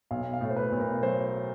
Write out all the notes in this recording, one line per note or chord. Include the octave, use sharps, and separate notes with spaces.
B1 F5
F5
A2
C5
B4
B1
A#4
F#3 C5